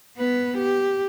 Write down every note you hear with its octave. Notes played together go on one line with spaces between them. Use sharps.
B3 B4
G4